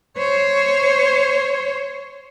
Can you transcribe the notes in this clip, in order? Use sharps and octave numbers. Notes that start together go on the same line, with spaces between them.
C5 C#5